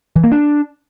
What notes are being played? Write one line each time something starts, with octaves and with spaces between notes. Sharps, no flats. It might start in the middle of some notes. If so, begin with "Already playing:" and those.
E3
A#3
D4